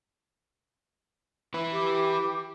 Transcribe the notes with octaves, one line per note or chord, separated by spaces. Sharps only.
E4 B4
G4